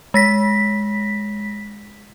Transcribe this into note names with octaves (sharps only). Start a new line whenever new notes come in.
G#3 A#6 B6